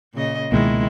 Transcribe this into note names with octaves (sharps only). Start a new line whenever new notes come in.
A#2 C#3 D#5
C#2 B2 D#3 G#3 A#3 E4